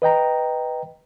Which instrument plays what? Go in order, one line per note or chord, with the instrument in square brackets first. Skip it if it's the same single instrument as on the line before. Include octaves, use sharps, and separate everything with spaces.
[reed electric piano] B4 D#5 G5 A#5